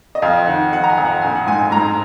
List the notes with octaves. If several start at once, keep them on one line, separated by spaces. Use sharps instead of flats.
D#5
F2 F5
D#3 F#5
F2 F#5
A#5
G#5
F2
F#5
A#1 G#5
F#5
G#2 G#5
G#2 A#5